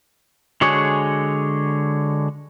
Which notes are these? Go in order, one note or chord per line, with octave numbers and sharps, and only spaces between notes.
D3 G#3 F#4 G#4 C#5